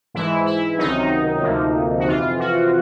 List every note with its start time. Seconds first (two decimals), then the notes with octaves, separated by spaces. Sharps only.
0.14 G#2 E3 G#3 E4
0.46 E4
0.78 C#2 C3 D#3 F#3 D#4
1.43 D2 C3 F3 A#3
1.99 F#4
2.07 F2 C3 E3 F4
2.39 F#4